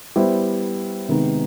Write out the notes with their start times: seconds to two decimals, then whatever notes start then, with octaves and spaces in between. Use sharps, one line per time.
0.16 G3 B3 E4 G4 C5
1.08 C3 D#3 G#3 B3 D#4